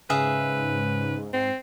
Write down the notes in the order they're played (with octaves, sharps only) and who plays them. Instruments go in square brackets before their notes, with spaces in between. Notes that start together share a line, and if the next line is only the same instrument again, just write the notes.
[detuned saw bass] G#2 [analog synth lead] C#3 [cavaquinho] G#4 E5 F5 [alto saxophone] B4
[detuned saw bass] G#2 [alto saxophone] C4 [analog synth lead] C7